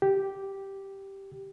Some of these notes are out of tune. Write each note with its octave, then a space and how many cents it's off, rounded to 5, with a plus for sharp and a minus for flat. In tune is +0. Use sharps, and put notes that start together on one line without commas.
G4 -5